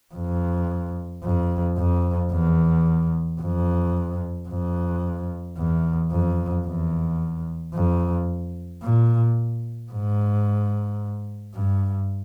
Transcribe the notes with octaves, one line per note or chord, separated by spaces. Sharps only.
F2
F2
F2
E2
F2
F2
E2
F2
E2
F2
A#2
G#2
G2